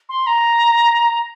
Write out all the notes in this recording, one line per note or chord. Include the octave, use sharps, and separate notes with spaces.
C6
A#5